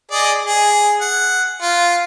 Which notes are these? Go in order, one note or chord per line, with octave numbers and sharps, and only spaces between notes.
G#4 D5 D#5
G#4
F#5
F4